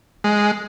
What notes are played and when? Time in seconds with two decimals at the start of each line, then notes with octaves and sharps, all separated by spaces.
0.24 G#3